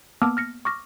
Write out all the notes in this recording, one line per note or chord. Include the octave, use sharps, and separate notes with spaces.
A#3 B3 A5 D6 E6 F6
F6 A#6 C#7
C#6 D6 F6 A#6